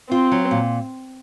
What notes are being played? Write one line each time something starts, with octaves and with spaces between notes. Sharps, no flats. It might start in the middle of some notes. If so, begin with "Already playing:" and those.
C4 F4
F#3
A#2